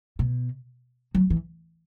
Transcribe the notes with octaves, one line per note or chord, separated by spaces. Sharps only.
B2
F#3
E3